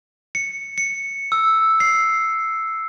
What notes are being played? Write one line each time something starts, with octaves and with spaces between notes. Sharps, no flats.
C#7
C#7
E6
C7